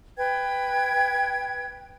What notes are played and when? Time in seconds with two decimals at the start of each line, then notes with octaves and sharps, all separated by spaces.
0.17 B4 G5 G#6